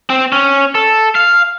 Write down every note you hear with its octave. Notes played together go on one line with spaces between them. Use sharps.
C4
C#4
A4
F5